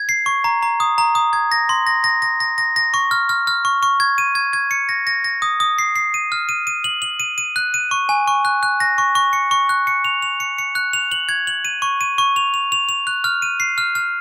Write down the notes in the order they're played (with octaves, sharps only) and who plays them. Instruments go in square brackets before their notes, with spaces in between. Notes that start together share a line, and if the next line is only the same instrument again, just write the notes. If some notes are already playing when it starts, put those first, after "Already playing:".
Already playing: [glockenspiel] G#6
C7
C#6
A#5
A#5
D#6
A#5
D#6
G#6
A#6
C6
A#6
A#6
A#6
A#6
A#6
A#6
C#6
F6
F6
F6
C#6
C#6
G#6
D#7
G#6
G#6
C#7
A#6
A#6
A#6
D#6
D#6
C7
C7
D#7
F6
D#7
D#7
F#7
F#7
D#7
D#7
F#6
D#7
C#6
G#5
C#6
F#6
F#6
A#6
C#6
C#6
C#7
C#6
F#6
C#7
F7
F7
C#7
C#7
F#6
F7
F#7
G#6
F#7
D#7
C#6
D#7
C#6
F7
F7
F7
F7
F#6
F6
D#7
C7
F6
F6